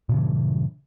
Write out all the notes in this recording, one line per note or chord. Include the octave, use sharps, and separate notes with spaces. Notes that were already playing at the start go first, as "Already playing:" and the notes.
G2 A#2 C#3 E3